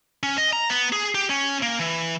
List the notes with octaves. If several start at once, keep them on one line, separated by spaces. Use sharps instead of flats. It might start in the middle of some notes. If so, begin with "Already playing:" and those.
C#4
D#5
A#5
B3
G#4
G4
C#4
A#3
E3